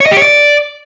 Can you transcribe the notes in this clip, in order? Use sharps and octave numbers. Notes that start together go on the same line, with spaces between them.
C#5
D#5
G4
C#5
D5